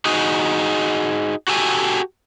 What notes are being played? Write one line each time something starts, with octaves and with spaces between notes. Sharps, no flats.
D#4 F#4 G#4
F#4 G4 A4 G#5